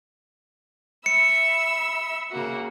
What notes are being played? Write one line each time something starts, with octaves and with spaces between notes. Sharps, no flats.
E5 B5 E6 C#7
C#3 A#3 F#4